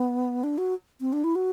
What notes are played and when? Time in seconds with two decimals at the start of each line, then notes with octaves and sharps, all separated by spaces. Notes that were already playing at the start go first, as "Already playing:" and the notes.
Already playing: B3
0.43 D4
0.58 F#4
1.01 C4
1.13 D4
1.24 E4
1.35 F#4